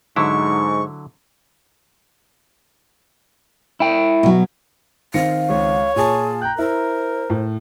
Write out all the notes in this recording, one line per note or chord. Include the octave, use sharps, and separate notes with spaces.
G#2 D3 F#3 E4 C#6
E4 G5
B2 F#3
D#3 C4 F5 A#6 C#7
C#2 C#5
A#2 F4 G#4 G#5 A5
G5 A#5 F#6
E4 A#4 C5
A2